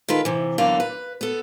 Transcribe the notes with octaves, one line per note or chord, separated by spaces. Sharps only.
D#3 F4 A4 B4
C3 E3
E2 D3 F#3 A#3 A4 F5
B4
B3 A4